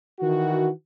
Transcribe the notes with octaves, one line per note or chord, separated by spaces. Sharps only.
D#3 E3 F#4